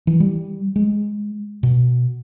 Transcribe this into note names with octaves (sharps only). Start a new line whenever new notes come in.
E3
G3
G#3
B2